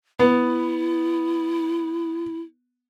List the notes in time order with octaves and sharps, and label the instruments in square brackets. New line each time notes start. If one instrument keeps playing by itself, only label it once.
[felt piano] B3 [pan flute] E4